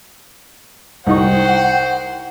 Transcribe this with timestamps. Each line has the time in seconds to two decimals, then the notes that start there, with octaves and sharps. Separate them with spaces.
1.07 C2 D#4 C5 F#5 G5 C#6